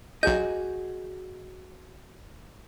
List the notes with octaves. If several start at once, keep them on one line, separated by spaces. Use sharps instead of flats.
B1 F#4 G#4 D#5 G6